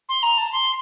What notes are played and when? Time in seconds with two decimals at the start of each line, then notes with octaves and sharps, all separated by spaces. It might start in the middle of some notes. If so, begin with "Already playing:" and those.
0.09 C6
0.23 A#5
0.38 A5
0.52 C6